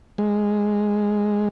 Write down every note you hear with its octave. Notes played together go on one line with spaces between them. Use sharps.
G#3